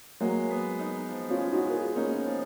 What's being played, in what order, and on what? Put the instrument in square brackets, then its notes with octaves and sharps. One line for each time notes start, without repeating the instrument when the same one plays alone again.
[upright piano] F#3 A#3 [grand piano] G#3
[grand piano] B3
D#4
F3
[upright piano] C#4 F4
[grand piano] G#3
[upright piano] D#4 F#4
[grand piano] B3 [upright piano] A#4
[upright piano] F4 G#4
[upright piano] A#3 C#4 [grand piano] D#4
[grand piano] F3